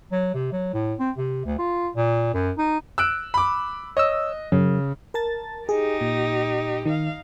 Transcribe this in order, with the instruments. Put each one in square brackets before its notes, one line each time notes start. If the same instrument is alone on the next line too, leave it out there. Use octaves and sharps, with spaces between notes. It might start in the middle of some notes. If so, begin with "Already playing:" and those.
[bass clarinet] F#3
C3
F#3
A2
C4
C3
D2
F4
A#2
F#2
D#4
[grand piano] E6 F#6 D7
B5 D6
[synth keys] C#5 E6 [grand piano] D#5
[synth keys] F#2 [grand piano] C#3
[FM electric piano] A#4 A5 A6
[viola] D#4 G4 [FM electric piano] G#4
[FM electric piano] A#2
[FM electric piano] D#3 [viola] D#4 F5